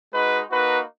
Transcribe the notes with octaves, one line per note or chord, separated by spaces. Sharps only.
G#3 D#4 F#4 B4
A#3 D#4 F#4 B4